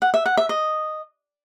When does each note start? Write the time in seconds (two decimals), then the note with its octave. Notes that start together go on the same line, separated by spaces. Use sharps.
0.02 F#5
0.14 E5
0.26 F#5
0.37 E5
0.49 D#5